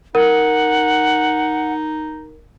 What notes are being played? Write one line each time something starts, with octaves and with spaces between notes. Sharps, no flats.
D#4 A#4 F#5